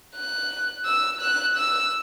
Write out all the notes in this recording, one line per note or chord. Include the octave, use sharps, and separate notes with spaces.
F#6
E6
F#6
E6